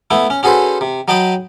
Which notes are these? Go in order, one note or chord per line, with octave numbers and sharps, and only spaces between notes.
A3 B3 E4
C#4
C#4 F#4 G#4 A4 B4 C5
C3
F#3 D#5 G5 A5 B5 D#6